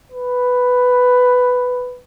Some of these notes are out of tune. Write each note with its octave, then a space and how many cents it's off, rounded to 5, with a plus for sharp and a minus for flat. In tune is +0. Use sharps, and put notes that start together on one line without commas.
B4 +5